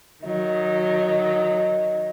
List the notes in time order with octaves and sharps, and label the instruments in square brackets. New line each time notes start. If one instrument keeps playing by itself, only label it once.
[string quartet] D#3 F#3 [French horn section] D#5